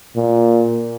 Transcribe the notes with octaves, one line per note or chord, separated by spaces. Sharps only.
A#2